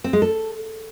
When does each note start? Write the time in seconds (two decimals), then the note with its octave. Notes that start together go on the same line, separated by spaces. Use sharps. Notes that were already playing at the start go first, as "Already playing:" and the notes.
0.04 C4
0.13 G#3
0.22 A4